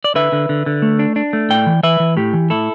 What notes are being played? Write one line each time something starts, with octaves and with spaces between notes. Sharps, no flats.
D5
D3 B4 E5
D3
D3
D3
A3
D4
D4
A3
A2 D5 G5
E3
E3 B4 E5
E3
A2 G4
E3
A2 E4 A4